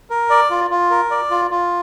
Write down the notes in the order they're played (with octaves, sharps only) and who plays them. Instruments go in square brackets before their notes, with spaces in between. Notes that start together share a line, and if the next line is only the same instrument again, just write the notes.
[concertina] A#4
D5
F4
F4
A#4
D5
F4
F4